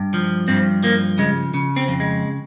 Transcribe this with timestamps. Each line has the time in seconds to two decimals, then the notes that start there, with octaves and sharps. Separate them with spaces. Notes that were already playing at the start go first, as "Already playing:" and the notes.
Already playing: G2
0.14 F3
0.48 G2 C4
0.83 F3 A#3
1.18 C#3 G#3
1.54 C#3
1.76 C4
1.88 F2
2.00 G#3